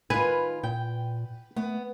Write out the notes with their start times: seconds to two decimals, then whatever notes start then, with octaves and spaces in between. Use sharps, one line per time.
0.10 D#3 F4 B4 G#5
0.63 A#2 G5
1.56 A3 B3